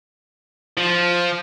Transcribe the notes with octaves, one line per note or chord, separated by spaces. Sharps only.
F3